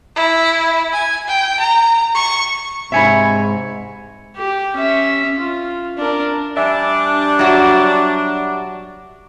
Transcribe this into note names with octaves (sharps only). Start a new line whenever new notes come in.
E4
G#5
G5
A#5
C#6
G#2 C3 C#5 E5 G#5 B5
G4
C#4 E5
F4
D4 A#4
G3 D4 E5 G#5
F#3 F#4 E5 A#5 D6